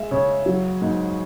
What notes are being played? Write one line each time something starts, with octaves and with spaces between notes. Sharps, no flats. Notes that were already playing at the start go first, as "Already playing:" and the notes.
Already playing: G#3 E5
C#3 C#5
F#3
G#2